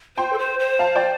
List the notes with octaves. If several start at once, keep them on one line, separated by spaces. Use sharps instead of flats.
C5 G5 C6
A4
C5
C5
F5 A5
D5 G5